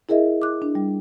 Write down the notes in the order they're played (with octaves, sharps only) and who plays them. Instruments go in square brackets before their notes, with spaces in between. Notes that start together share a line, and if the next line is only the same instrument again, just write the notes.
[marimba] E4 G#4 A#4 D#5 E5
D6 F#6
D4
G3